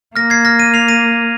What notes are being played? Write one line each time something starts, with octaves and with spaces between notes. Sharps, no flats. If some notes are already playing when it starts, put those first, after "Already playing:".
A#3 F6 A#6
G#6 C7
F6 A#6
A#6 D#7
C7 F7
A#6 D#7